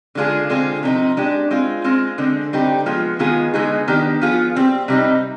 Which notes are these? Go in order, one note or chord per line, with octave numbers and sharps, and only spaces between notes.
D3 G#3 D4 F4 G#4
D3 G#3 C4 F4 G#4
C3 F3 C4 D#4
G#3 D4 G4
G#3 C4 F4
G#3 C4 F4
D3 G#3 C4
D3 G3 C4 D#4 G4
F3 G#3 B3 F4
D#3 G#3 B3 F4 G#4
D3 G#3 B3 D#4 G#4
D#3 B3 D4 G4
F3 B3 F4 G#4
G3 C4 G4
C3 G3 C4 D#4